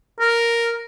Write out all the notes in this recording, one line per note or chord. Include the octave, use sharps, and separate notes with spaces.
A#4